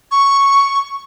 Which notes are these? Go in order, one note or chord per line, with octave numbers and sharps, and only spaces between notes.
C#6